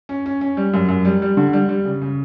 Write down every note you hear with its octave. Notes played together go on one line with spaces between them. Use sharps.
C#4
C#4
C#4
G3
F#2
F#2
G3
G3
D3
G3
G3
C#3
C#3